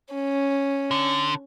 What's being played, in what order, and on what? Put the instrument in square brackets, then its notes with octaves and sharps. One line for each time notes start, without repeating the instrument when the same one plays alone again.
[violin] C#4
[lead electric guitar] D3